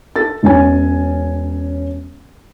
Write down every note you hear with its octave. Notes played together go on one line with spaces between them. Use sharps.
A4 A6
E1 C#4 G#5